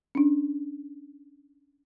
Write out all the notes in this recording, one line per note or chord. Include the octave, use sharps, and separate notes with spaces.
C#4 D4